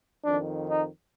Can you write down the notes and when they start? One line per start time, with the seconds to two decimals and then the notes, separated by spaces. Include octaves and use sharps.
0.25 F2 D#3 D4
0.70 D#4